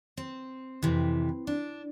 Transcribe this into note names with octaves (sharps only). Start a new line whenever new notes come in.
C4
F2 C3 E3
D4